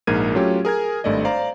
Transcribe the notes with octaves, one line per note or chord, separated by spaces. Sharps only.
A#1 G#2 A#4 G#6 D#7
F#3 A3 C#4 F4 G4
G#4 A#4 G#5 G#6
G#1 G2 A3 D5 D#5
C5 D5 F5 A#5